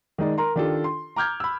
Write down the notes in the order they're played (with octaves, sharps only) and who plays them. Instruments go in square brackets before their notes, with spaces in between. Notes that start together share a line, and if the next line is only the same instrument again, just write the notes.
[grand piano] D#3 G#3 D#4 D5
A#4 A#5 C6
D#3 D4 F4 G4 A4
C6
A#5 D6 F6 G6 G#6
B5 E6